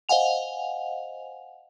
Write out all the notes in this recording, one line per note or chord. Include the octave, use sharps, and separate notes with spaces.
C5 D#5 F5 F#5 G#5 F7